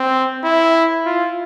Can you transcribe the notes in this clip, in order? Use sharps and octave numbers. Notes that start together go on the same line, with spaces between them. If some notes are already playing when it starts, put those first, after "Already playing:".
Already playing: C4
E4
F4